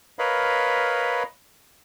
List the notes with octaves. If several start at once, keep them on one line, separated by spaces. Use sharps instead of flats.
A#4 B4 C#5 D#5 F5 B5